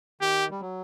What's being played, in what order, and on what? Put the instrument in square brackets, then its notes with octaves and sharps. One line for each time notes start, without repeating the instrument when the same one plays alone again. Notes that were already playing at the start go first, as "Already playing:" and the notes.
[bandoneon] D#3 [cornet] G4
[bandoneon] G3
F#3